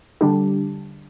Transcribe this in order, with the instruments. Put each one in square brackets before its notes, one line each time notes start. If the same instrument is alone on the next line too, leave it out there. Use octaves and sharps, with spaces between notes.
[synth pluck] D3 G3 D4 G4